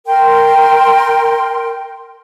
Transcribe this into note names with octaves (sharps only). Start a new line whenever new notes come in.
A#4 G5 C6